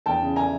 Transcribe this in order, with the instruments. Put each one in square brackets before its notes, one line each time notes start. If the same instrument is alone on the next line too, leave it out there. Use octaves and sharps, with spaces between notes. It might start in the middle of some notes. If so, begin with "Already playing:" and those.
[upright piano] E2 G5 A5
C#3
G#5 A#5